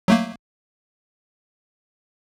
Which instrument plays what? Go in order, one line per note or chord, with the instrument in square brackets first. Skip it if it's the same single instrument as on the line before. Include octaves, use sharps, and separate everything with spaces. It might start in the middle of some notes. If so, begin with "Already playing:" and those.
[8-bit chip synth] F#3 A3 A#3